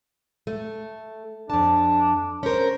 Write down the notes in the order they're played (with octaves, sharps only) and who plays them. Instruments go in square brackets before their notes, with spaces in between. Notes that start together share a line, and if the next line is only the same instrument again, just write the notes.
[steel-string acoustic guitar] A3
[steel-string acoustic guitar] F2 A5 [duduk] D4
[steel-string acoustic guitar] C#4 A#4 [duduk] C5